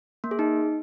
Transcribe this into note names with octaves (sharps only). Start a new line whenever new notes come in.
A#3
G#4
D#4